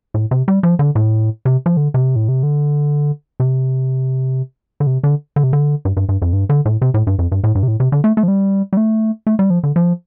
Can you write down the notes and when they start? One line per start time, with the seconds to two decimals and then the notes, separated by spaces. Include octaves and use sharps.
0.14 A2
0.31 C3
0.48 G3
0.63 F3
0.79 D3
0.95 A2
1.45 C3
1.66 F3
1.77 D3
1.94 C3
2.16 A2
2.28 C3
2.43 D3
3.40 C3
4.80 D3
4.87 C3
5.03 D3
5.36 D3
5.44 C3
5.53 D3
5.85 G2
5.97 G2
6.09 G2
6.22 F2
6.33 G2
6.49 D3
6.65 A2
6.82 C3
6.94 A2
7.07 G2
7.19 F2
7.32 G2
7.44 A2
7.55 G2
7.63 C3
7.68 A2
7.80 C3
7.92 D3
8.04 A3
8.17 A3
8.23 F3
8.28 G3
8.73 G3
8.77 A3
9.27 A3
9.39 G3
9.50 F3
9.63 D3
9.76 F3